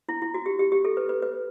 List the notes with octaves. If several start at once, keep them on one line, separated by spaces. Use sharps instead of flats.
E4
E4
F#4
G4
G4
G4
A4
B4
B4
B4